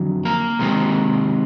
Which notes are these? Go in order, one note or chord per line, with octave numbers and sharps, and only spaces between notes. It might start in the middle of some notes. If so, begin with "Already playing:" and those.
Already playing: F2 D3 F#3
A#3 A#4
C3 D#3 G#3 C4